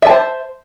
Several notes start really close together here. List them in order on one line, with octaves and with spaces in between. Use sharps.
E5 A5 C5